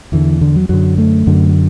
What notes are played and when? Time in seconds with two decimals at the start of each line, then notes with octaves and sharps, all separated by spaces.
0.12 E2 D3 E3
0.41 D3
0.56 F#3
0.69 F#2 D3 F#3
0.98 A3
1.27 F#2 D3